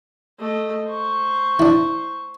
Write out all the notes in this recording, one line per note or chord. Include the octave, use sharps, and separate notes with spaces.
A3 D#5
C5 C#6
D4 E4